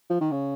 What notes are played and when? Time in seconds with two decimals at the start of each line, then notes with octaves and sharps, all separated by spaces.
0.10 F3
0.21 D#3
0.31 C#3